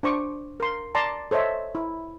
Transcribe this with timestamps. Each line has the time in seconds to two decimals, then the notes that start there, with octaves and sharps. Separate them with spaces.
0.03 D4 C5 C#6 D6
0.60 A#4 C6
0.95 D5 A5 A#5 C6
1.31 A4 C5 C#5 D#5 E5
1.75 E4